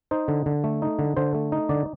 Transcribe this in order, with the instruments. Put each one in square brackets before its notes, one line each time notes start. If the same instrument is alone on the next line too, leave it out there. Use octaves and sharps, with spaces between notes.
[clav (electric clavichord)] D#4 C5
D3
D3
A3
D#4
D3
D3 C5
A3
D#4
D3 D5